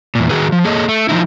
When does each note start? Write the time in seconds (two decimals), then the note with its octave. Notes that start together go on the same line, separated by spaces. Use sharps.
0.15 E2 A#2
0.30 D#3 F#4 G#4 B4
0.52 F3
0.64 A#3 G#4 A4 C#5 D#5
0.89 A3
1.09 F3 F#3 D#4 E4